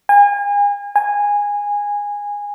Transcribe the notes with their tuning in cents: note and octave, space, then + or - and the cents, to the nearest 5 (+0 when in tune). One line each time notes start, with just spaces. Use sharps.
G#5 -35
G#5 -15